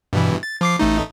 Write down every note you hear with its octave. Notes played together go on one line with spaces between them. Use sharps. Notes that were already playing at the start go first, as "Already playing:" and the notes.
G2 B2 E3
A6
F3 D6 C7
A1 A3 D#4